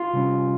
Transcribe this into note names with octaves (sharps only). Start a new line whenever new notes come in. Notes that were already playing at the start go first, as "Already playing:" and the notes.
Already playing: F4
C3 G3 C#4